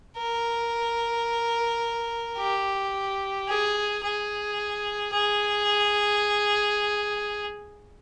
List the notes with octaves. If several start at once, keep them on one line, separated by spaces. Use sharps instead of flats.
A#4
G4
G#4
G#4
G#4